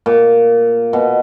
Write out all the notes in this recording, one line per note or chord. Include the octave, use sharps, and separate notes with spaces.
A#2
B2